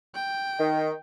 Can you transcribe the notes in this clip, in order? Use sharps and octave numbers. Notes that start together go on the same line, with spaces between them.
G5
D#3